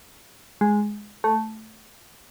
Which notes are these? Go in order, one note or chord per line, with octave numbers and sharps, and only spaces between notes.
G#3
A3